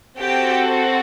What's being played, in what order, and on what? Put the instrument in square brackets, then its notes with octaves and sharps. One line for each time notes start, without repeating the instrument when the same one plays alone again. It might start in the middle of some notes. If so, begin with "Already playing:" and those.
[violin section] C4 F#4 G4 A4 G5